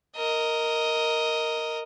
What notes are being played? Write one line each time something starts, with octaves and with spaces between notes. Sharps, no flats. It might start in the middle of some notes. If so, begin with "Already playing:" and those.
A#4 D#5